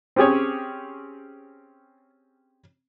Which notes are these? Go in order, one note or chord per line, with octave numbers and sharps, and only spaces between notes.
C4 C#4 G4 G#4 C#5